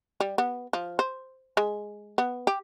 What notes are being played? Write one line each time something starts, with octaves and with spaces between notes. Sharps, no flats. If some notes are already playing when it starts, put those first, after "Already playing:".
G3
B3
F3
C5
G#3
B3
G4